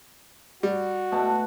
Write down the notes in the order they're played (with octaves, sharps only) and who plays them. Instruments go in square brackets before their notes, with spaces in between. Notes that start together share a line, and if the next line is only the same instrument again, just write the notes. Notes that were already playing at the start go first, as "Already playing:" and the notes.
[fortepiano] G3 [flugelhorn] F#4
[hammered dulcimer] B2 A3 A5